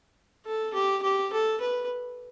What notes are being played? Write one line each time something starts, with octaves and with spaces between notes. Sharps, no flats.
A4
G4
G4
A4
B4